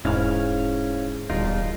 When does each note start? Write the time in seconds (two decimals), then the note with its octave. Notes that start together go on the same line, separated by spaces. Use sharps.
0.05 E1 G#2 C#4 E4 F5
1.30 D1 E2 B2 G3 D#4 F4 A#4